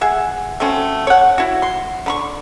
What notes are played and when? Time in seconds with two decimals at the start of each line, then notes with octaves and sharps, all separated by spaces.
0.01 G#4 E5 F#5
0.60 A3 C4 C#4 F#4
1.07 C#5 F#5
1.38 E4 F#4
1.62 C6
2.06 D3 B5 C#6